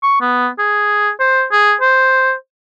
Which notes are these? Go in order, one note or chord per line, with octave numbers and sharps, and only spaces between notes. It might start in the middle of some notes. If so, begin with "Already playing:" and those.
C#6
B3
G#4
C5
G#4
C5